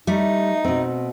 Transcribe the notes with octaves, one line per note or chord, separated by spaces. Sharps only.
G3 A3 D#4
B2 C4